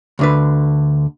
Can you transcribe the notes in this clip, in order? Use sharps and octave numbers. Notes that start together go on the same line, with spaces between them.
D2 D3 B4